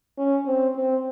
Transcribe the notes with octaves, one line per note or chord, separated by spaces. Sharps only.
C#4
C4
C4